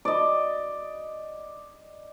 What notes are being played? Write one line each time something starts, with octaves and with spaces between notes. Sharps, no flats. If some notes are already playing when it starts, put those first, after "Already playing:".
D5 D#5